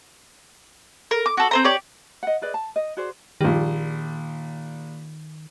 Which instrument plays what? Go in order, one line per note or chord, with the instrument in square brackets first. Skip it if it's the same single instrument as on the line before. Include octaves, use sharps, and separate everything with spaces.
[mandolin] A#4
D6
F#4 A4
C4 C5 A#5
G4 C#5 D5
[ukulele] D#5 F#5
G#4 B4 D5 D#5
A5
D#5
F#4 G#4 C5 D5
[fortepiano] A#1 G3 [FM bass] D#3